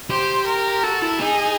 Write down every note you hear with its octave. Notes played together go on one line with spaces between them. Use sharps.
G4 C5
A#4
F#4 A4
E4
D#4 G#4